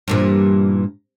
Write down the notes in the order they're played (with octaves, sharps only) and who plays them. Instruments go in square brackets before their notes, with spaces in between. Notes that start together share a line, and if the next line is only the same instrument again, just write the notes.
[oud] G2 A#2 E3